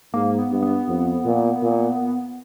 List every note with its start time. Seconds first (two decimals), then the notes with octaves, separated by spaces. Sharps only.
0.13 G#2 A#3
0.38 B3
0.51 G2
0.62 B3
0.88 F2
1.25 A#2
1.62 A#2